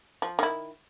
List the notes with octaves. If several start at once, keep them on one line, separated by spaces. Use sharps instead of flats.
F3
D#3 E4